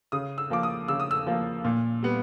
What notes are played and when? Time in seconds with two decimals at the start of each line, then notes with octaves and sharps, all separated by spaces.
0.12 C#3 D#6
0.38 E6
0.50 F3 A#3 D6
0.63 D#6
0.88 C#3 E6
1.00 D#6
1.11 E6
1.27 F3 A#3
1.64 A#2
2.03 G3 B3